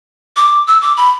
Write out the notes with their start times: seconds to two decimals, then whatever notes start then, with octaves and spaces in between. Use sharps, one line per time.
0.37 D6
0.67 E6
0.82 D6
0.97 B5